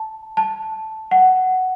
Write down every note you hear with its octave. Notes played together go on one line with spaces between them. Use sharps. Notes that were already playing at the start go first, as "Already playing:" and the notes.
Already playing: A5
A5
F#5